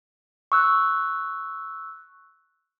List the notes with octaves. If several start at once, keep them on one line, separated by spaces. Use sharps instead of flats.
C#6 E6 F#6